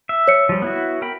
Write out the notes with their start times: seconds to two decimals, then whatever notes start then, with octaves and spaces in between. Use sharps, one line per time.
0.09 E5
0.28 C#5 C#7
0.49 F3 G3
0.62 B3 E4 F#4
1.02 A#4 G5 B5